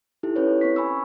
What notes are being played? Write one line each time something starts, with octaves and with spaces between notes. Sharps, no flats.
D#4 E4 G4 A4
C#4 E4 B4 C#5
C4 C#6 B6
G#5 B5 C#6 E6